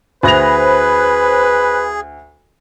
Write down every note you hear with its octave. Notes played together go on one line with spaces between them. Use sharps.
D2 G#4 B4 C5 B5 F#6 A#6 F7